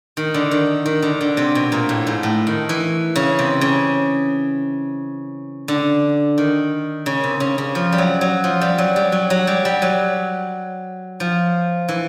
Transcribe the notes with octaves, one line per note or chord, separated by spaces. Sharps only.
D#3
D3
D#3
D#3
D3
D3
C3
B2
A#2
A2
G#2
A2
D#3
E3
C#3
C3
C#3
D3
D#3
C#3
C3
C#3
C#3
F3
G3
F#3
F#3
F3
G3
F#3
G3
F#3
F#3
G3
G3
F#3
F3
E3